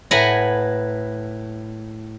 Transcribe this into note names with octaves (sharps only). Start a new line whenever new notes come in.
A2 B4 F#5 G#5 A#5